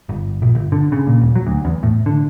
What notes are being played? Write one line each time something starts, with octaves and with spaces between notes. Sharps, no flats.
G1
A#1
G1
D3
C#3
A#2
D#1
F#3
D2
E2
A2
D3